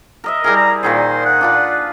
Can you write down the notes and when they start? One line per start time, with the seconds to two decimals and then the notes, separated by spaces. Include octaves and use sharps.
0.24 A#4 D#5 E5
0.44 G3 E4 G#4 A#4
0.56 A#5
0.83 A#2 D#3 G#4 C5
1.25 F#5
1.41 D4 F4 B4